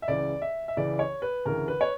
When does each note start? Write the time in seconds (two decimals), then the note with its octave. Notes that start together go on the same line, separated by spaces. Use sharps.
0.02 E5
0.08 C#2 C#3 E3 D5
0.42 E5
0.68 E5
0.77 C#2 C#3 E3 D5
0.99 C#5
1.22 B4
1.45 D2 C#3 E3 A#4
1.68 B4
1.81 C#5